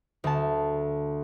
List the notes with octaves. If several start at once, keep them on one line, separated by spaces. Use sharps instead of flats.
D2 A5